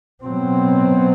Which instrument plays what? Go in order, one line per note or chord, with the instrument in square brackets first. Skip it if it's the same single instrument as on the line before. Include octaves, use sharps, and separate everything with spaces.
[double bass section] B2 F#3 C4